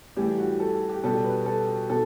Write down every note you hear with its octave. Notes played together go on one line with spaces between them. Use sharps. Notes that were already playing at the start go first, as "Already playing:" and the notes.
A2 E3 G3 G4
F#4
A4
G4
B2 G3 A4
B4
A4
B2 A4